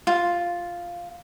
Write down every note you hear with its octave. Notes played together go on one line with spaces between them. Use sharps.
F4